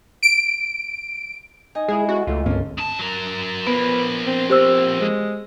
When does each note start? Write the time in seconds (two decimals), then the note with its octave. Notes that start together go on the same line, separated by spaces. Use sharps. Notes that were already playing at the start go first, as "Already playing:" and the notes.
0.23 D7
1.75 D#4 D#5 G#5
1.88 G#3 E4 G#4
2.09 C#4 F#4 A4
2.27 C#2 A3 F4
2.46 D2 G2 A#3 C4 C#4 F4 A4
2.78 C#3 A5
2.99 F#3 A#4
3.67 F3 A#3 B3 B4
4.26 C4
4.50 C4 G4 C5 E6
5.00 G#3